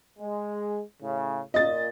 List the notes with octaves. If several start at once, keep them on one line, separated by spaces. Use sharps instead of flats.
G#3
A2 C#3
A#2 D#5 A6